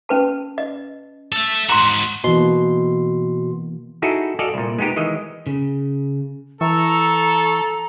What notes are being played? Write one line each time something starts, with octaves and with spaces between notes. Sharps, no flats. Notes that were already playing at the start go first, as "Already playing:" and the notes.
C#4 B4 A5
D#5
A4 E5
G#2 F#4 A#5 C6
B2 E3 A#3 C6
D#4 E4 F#4 G#4 A4
F#4 A4 D5 D#5 F5 G#5
C2 A#2
G#3 B3 D#4 G4
D#3 E3 G#3 D#5
C#3
E3 A4 A#5 C#6 E6